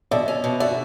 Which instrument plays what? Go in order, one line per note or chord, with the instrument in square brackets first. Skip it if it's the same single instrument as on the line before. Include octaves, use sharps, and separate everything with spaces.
[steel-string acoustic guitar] B2 [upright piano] D5 E5
[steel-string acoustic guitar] C#4
B2
[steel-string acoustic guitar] F#4 [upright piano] D5 E5